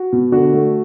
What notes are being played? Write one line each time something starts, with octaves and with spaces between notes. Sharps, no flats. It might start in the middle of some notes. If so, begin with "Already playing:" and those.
Already playing: F#4
B2
D3 F#4
A3